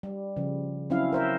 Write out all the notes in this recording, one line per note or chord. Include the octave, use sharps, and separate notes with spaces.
G3
C#3 F3
F#3 C4 C#4 E4 F5
A#4 C5 E5